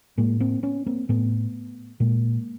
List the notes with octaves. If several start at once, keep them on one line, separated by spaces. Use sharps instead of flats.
A2 G#3 A#3
A#3 C4
B3 C#4
A#3 C4
A2 A3 B3
A#2 G#3 A#3